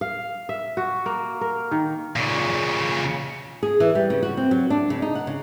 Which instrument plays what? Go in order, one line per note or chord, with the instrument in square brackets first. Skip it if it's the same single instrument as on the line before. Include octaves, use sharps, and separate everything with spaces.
[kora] F5
E5
F#4
A#3
A#4
D#3
[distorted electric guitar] A#2 C#3
[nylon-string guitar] G#4
E3
G3
C#3
F#4
C4
F#3
D4
C#3
D#4
F#5
C#3